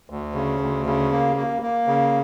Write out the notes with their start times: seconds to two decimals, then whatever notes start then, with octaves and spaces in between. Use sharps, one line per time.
0.10 D2
0.35 C#3
0.60 D2
0.86 C#3
1.11 A#3
1.37 A#3
1.62 A#3
1.87 C#3